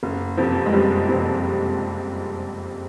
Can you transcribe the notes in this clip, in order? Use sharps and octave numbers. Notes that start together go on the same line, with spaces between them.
F#1
F2 C3 F3
G#3
F#1 G3
F2 C3 F3